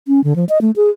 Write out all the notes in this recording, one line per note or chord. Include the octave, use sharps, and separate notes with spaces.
C#4
D3
F3
D#5
A3
G#4